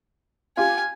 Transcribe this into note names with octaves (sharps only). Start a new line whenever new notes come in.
F4 G4 G#5